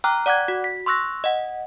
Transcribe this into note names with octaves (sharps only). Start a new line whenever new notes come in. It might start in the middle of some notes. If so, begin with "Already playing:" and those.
G5 A#5 D6 F6 F#6
D5 F#5 D6 F#6 G#6
F#4
B6
C6 C#6 E6 F#6 A#6
D#5 F#5